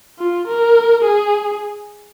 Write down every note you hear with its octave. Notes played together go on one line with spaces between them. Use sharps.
F4
A#4
G#4